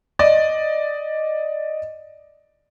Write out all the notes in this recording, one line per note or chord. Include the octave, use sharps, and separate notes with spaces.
D5 D#5